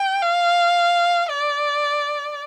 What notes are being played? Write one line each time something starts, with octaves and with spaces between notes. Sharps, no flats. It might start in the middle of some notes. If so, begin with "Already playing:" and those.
Already playing: G5
F5
D5